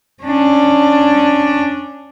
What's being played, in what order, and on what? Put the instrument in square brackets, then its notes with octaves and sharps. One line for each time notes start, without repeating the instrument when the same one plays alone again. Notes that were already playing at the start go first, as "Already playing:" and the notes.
[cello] C#4 D4